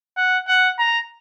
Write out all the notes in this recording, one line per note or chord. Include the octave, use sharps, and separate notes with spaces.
F#5
F#5
A#5